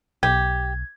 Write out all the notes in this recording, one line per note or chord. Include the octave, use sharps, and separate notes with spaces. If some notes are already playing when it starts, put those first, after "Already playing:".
B1 G4 G#6